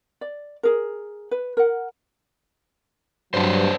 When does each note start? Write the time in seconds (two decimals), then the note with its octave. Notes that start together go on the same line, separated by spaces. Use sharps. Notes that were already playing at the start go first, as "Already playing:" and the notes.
0.21 D5
0.63 G#4 A#4
1.31 B4
1.57 A#4 F#5
3.34 G2 F#3 D4 B4 C5